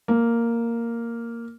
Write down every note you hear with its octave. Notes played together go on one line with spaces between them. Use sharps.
A#3